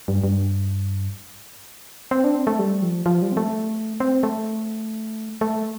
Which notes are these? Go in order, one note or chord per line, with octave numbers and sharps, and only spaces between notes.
G2
G2
C4
D4
C4
A3
G3
F3
F3
G3
C4
A3
C4
A3
A3